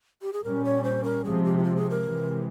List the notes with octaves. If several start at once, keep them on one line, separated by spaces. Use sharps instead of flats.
G4
G#4
A#2 G3 C#4 A#4
C#5
C5
A#4
C3 F3 G#3 G#4
G4
E4
F4
G#4
A#4
C3 E3 G#3